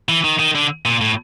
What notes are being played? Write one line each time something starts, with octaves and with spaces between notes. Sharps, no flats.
E3
D#3
D#3
D3
A#2
A2